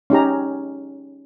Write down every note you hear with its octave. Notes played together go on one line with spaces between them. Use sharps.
C#4 D#4 G4 A#5